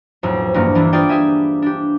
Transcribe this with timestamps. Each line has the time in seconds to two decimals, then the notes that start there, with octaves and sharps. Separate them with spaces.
0.23 B1 F2 A2
0.54 E2 G2 A#2 A#3
0.75 E3 D4 E4 F4
0.93 F4 G#4 D5 G5
1.09 G4 G#4 E5 G#5
1.62 D4 G4